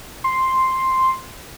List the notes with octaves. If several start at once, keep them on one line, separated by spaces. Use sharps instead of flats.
C6